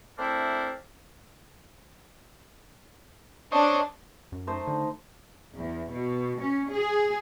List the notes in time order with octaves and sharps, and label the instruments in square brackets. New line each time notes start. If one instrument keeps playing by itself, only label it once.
[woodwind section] A3 C4 D4 E4 A#4 C5
[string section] D4 [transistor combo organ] C5 C#5 D#5
[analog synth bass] F#2
[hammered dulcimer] A3 D#4 C5
[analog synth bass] D3
[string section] E2
B2
C#4
G#4